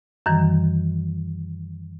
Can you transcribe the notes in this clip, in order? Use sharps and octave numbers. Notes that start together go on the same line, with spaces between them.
F#2 D#3 E3 G3